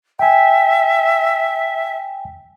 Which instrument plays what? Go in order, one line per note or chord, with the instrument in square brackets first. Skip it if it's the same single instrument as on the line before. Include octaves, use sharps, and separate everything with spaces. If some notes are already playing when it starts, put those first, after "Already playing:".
[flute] E5 [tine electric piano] G5 G#5